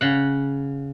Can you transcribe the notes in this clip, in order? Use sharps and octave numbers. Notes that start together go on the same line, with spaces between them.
C#3 F#5